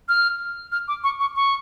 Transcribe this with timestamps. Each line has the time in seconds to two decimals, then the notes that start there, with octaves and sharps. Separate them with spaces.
0.09 F6
0.72 F6
0.88 D6
1.04 C#6
1.20 C#6
1.36 C#6